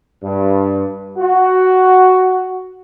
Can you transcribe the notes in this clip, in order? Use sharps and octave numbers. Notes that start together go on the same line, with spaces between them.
G2
F#4